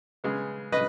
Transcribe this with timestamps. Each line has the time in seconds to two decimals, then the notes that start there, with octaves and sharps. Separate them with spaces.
0.24 C#3 G#3 B3
0.72 C#3 B4 D#5